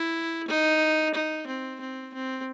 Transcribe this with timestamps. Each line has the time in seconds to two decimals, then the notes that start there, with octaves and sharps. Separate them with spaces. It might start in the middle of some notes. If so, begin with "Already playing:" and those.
Already playing: E4
0.48 D#4
1.14 D#4
1.47 C4
1.80 C4
2.14 C4